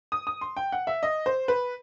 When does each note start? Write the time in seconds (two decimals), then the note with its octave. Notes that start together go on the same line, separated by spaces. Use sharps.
0.12 D#6
0.27 D#6
0.41 C6
0.57 G5
0.72 F#5
0.87 E5
1.03 D#5
1.26 C5
1.48 B4